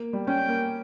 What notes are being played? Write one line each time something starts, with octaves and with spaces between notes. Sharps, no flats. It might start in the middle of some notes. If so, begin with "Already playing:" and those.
Already playing: A#3
G3
C#4 G5
A#3